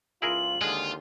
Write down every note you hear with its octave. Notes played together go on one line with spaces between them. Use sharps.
C#2 E4 F4 G#4 A#4 F#7
D#2 D3 G#3 F4 G#4